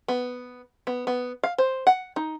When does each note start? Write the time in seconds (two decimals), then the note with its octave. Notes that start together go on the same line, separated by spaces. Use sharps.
0.08 B3
0.87 B3
1.07 B3
1.44 F5
1.58 C5
1.87 F#5
2.16 D#4